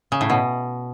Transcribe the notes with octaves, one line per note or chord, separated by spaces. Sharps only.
C#3
A2
B2